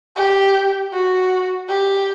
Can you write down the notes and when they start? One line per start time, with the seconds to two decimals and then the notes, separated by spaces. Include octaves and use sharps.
0.16 G4
0.93 F#4
1.69 G4